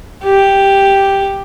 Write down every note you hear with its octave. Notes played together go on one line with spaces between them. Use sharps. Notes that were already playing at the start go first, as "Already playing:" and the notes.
G4